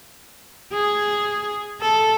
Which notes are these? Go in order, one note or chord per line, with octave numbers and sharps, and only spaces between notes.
G#4
A4